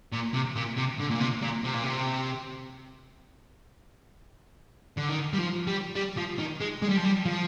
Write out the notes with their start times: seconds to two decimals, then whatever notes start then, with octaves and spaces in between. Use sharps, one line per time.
0.12 A#2
0.34 C3
0.55 A#2
0.77 C3
0.99 D3
1.10 A#2
1.20 C3
1.42 A#2
1.64 C3
1.74 A#2
1.83 C3
4.98 D3
5.10 D#3
5.33 G3
5.38 F3
5.67 G3
5.96 G3
6.17 F3
6.39 D#3
6.61 G#3
6.82 G#3
6.89 G3
6.97 F3
7.05 G3
7.25 F3